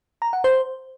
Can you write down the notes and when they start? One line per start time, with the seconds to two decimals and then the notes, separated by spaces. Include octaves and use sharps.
0.22 A#5
0.33 F#5
0.44 C5